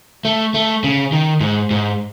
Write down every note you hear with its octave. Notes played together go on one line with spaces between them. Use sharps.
A3
A3
C#3
D#3
G#2
G#2